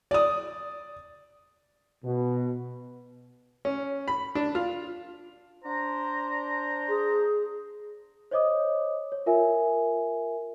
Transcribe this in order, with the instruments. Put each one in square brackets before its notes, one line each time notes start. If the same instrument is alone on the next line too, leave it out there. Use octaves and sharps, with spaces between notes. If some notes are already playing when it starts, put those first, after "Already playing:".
[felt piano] D5 D#6
[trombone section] B2
[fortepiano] C#4
B5
D4
F4
[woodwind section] D4 C5 A#5
[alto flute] G#4
[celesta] C5 C#5 D#5 D6 D#6
C#5
F4 A#4 E5 G#5